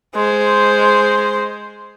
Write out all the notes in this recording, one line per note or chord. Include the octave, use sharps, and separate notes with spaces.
G#3 C5